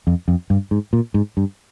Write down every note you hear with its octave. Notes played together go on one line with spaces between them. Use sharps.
F2
F2
G2
G#2
A#2
G#2
G2